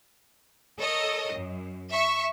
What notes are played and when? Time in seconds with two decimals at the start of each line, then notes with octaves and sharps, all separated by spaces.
0.79 A4 A#4 C#5 D#5
1.33 F#2
1.90 E5 C#6